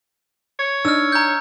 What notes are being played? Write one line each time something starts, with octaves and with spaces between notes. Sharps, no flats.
C#5
D4 D#4 E6 F6
A#5 G6